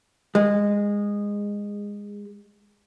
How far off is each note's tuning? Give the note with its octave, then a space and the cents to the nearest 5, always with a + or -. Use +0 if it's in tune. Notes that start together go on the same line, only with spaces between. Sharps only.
G#3 -20